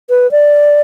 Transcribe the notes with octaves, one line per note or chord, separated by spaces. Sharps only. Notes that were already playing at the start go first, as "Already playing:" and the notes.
B4
D5